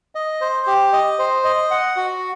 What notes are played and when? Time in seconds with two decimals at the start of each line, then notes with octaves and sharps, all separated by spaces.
0.15 D#5
0.41 C5
0.67 G4
0.93 D#5
1.19 C5
1.45 D#5
1.71 F#5
1.96 F#4